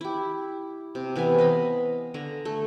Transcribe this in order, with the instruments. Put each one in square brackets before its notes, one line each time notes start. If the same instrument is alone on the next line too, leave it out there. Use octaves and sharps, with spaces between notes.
[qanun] E4 G4
C3
C3 E3 B3 G#5
D#5 F5 B5
D3 G#5 A#5
A3